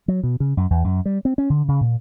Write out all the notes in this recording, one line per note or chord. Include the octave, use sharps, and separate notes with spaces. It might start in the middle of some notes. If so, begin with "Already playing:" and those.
F#3
B2
C#3
F#2
E2
F#2
G3
C4
C#4
D3
C#3
A#2